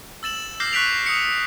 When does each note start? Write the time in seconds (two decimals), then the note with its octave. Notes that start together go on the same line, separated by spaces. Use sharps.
0.23 E6 A6 E7 F#7
0.60 D6 F6 G6 A#6 C7
0.73 C#6 F#6 B6 D7 F7
1.06 D#6 C#7